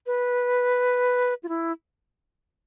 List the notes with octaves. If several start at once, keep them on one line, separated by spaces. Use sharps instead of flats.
B4
F4
E4